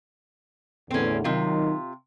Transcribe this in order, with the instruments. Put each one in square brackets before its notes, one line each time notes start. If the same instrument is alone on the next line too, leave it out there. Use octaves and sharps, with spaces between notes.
[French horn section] E2 A2 D3 [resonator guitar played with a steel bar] C4 C#4
[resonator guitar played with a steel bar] C3 F4 [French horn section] D#3 F#3 D#4